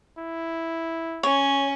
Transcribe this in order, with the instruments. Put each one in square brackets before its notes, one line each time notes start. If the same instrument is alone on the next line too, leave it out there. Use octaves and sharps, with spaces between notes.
[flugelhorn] E4
[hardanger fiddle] C#4 [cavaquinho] C#5